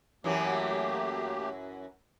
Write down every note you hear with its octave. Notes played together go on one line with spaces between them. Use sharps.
F#2 E3 F#3 A3 A#3 G4